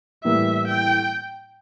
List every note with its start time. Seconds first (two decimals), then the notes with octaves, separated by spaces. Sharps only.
0.24 A2 E3 G3 A#3 E4 E5
0.68 G5